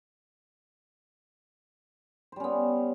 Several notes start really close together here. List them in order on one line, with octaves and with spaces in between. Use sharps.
C5 G3 C#4 B3